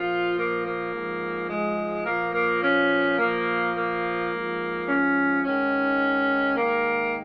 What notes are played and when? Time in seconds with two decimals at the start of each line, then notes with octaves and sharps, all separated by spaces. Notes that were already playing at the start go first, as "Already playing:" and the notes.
Already playing: A#2 F3 F4
0.37 A#3
0.65 A#3
0.93 G#2 F3
1.49 G#3
2.05 A#2 F3 A#3
2.33 A#3
2.62 C#4
3.19 A#2 F3 A#3
3.75 A#3
4.31 G#2 F3
4.87 C#4
5.43 G#2 D#3 C#4
6.57 G#2 D#3 A#3